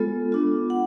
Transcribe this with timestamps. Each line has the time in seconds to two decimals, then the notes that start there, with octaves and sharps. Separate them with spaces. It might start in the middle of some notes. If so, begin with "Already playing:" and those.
Already playing: G#3 B3 F4 A4
0.32 B3 D4 F4
0.70 F#5